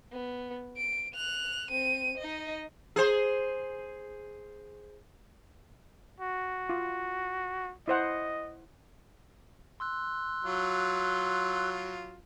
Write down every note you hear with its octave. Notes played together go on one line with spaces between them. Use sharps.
B3
D7
F#6 F7
C4 D#7
D#4 D#5
G#4 C5
F#4
F4
E4 C5 D#5 F#5
C6 E6 F#6
F#3 F4